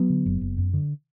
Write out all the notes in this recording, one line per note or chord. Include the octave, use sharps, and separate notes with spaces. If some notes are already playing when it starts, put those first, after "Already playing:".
Already playing: F#3 B3
D3
F#1
F#1
F#2
D3